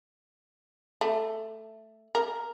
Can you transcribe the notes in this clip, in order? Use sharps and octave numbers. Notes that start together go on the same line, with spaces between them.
A3
A#4